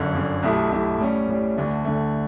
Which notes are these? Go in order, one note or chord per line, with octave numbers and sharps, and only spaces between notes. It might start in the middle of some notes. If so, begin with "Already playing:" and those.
Already playing: G1 F#2 D3
G1 F#2 D3
B1 B2 A3 E4 G4
B1 B2 A3 E4 G4
A2 G3 C#4
A2 G3 C#4
D2 D3 A3
D2 D3 A3